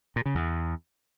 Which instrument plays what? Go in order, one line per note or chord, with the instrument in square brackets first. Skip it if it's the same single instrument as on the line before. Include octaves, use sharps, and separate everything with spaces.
[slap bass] A#2
C#3
E2